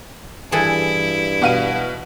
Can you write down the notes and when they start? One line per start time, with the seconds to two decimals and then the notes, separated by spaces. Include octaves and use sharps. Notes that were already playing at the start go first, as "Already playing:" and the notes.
0.52 G2 E3 E4 G#4 A4
1.42 B2 F5 D#7